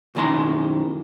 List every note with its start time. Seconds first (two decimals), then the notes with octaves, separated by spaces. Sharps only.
0.15 B1 F#2 D#3 E4 A#5 C6